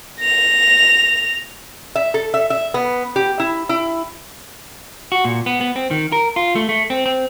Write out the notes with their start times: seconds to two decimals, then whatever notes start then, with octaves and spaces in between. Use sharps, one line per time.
0.21 A#6 F7
1.96 E5
2.14 A4
2.34 E5
2.50 E5
2.74 B3
3.16 G4
3.40 E4
3.69 E4
5.12 F#4
5.25 A#2
5.46 B3
5.61 B3
5.76 C4
5.91 D#3
6.12 A#4
6.36 F4
6.55 A3
6.69 A3
6.90 C4
7.06 C4